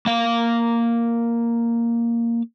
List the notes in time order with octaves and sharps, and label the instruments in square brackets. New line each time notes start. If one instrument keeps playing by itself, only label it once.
[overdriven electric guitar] A#3 F5